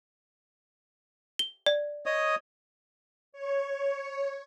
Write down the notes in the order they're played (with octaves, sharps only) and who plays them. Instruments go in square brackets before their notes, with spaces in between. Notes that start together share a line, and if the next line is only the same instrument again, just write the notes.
[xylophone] G7
D5
[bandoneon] C#5 D#5 D#6
[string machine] C#5